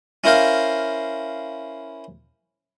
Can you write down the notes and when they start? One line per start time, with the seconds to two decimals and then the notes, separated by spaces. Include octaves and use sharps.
0.24 C#4 E4 A#4 C5 F5